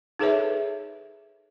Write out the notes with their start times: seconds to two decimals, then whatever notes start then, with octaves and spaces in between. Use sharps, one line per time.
0.19 D#4 G#4 A4 B4 C#5 E5